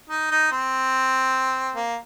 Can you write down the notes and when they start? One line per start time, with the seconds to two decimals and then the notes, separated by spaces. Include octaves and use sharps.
0.10 D#4
0.31 D#4
0.51 C4
1.75 A#3